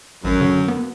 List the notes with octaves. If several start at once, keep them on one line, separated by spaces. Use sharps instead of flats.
A1 F#2
D3
B3